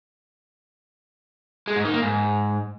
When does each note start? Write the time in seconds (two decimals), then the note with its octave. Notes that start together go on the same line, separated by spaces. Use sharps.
1.68 G#3
1.76 G#2
1.85 D#3
1.94 A#3
2.02 G#2